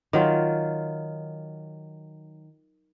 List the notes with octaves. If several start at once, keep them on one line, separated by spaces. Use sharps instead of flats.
D#3 F#3 F4